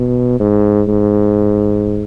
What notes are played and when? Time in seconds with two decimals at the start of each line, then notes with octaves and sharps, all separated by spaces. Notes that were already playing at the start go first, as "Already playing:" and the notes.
Already playing: B2
0.40 G#2
0.88 G#2